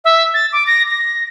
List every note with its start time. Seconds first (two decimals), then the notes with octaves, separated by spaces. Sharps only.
0.05 E5
0.34 A6
0.53 D6
0.67 A#6
0.91 A#6